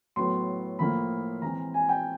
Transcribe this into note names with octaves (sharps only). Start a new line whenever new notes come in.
A2 F#3 B3 C6
A2 F3 A#3 B5
E3 G#3 C4 A#5
G#5
G5